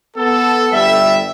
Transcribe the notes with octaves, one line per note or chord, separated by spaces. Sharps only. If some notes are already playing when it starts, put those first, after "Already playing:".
B3 A4
G1 G3 E5